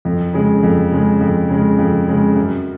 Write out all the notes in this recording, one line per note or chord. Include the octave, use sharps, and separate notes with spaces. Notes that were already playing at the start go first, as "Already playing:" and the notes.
F2
C#3 G#3
F2
C#3 G#3
F2
C#3 G#3
F2
C#3 G#3
F#2